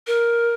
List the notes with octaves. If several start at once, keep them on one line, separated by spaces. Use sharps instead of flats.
A#4